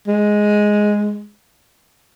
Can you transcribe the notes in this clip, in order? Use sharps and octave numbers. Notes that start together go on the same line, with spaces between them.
G#3